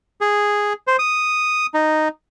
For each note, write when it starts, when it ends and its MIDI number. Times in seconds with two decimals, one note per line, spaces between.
0.21 0.73 68
0.87 0.96 72
0.99 1.66 87
1.74 2.08 63